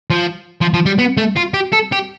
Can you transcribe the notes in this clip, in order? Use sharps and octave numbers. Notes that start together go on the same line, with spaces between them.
F3
F3
F3
G3
B3
A3
F4
G4
A4
G4